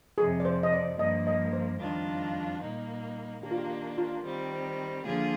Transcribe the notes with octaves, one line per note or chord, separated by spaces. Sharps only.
F2 C3 F3 G#4
D5
C5
D#5
D5
G2 F3 A#3 D#5
D#5
C5
F2 D#3 G3 D4 F4
A#2 G3 A#3 D#4
D#3 A#3 D4 G4
F4
G4
G4
F4
D#3 G3 C4
D3 F3 A#3 F4 G#4